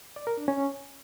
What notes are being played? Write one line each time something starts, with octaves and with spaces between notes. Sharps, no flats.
D5
A#4
D4
C#4